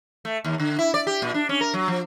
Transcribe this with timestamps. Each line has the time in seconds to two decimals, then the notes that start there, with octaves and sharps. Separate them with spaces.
0.25 A3
0.44 D#2
0.59 D3
0.79 E4
0.94 D5
1.07 G4
1.22 A#2
1.34 D4
1.49 C#4
1.61 A#4
1.74 F#3
1.88 F3